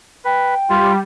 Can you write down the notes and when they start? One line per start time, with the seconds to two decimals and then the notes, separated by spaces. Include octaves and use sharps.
0.25 B4 G5
0.69 G3 F4